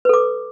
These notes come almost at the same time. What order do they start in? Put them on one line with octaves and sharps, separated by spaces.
B4 A4 D6